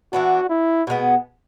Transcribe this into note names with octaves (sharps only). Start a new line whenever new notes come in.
E3 B3 D4 F#4
E4
B2 G#3 B3